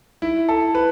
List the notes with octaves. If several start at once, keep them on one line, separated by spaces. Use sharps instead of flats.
E4
A4
B4